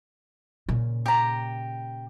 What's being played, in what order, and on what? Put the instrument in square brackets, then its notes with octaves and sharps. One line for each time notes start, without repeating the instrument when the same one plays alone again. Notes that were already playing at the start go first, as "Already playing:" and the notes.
[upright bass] A#2 C#3
[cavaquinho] G4 A#5